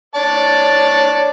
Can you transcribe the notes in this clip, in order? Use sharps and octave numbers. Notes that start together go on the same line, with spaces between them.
C#5 D5 A5